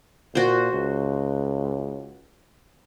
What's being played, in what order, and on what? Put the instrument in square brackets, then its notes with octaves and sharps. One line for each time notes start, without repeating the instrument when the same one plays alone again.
[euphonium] A#2 [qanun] F#4 C5
[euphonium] C#2